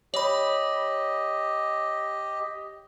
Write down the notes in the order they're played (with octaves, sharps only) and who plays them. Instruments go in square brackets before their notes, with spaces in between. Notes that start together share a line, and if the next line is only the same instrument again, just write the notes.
[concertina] G4 D#5 [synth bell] C#5 B5